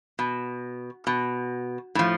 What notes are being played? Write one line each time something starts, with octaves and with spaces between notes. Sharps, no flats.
B2
B2
A2 F3